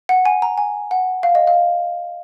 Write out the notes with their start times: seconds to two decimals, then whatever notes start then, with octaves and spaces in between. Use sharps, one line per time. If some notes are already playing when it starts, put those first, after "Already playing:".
0.09 F#5
0.25 G#5
0.42 A#5
0.58 G#5
0.91 F#5
1.23 F5
1.35 D#5
1.47 F5